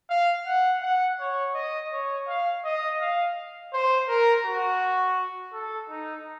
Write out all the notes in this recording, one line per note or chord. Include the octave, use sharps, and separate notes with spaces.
F5
F#5
F#5
C#5
D#5
C#5
F5
D#5
F5
C5
A#4
F#4
A4
D#4